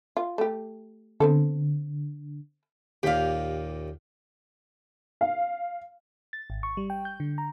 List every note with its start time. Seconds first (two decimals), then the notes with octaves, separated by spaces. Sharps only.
0.17 F4
0.38 A3 G4
1.20 D3 B3 C4 A4
3.03 D#2 A#2 G4 F5
5.21 F5
6.33 A6
6.50 G#1
6.63 C#6
6.77 G3
6.90 G5
7.05 G6
7.20 D3
7.38 A#5